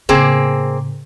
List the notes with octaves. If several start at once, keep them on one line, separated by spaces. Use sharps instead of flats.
A2 C#3 A#3 C4 G#4